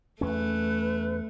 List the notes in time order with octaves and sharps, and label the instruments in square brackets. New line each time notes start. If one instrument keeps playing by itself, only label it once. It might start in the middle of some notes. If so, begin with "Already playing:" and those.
[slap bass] E2 C#4 [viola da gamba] A3 [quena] B4